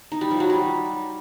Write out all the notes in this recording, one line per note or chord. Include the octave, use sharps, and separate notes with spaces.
D#4
G3
F3
F#3
G3